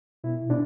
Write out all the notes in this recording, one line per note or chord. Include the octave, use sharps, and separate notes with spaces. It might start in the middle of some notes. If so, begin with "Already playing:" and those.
B2 E4
B2 D4